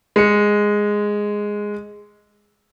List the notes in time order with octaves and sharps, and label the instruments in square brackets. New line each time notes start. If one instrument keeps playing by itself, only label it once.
[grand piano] G#3 C#7